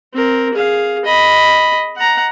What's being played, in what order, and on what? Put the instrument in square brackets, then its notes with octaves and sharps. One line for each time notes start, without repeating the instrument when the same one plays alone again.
[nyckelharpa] C4 A#4
G#4 F5
D#5 B5
F#5 A#5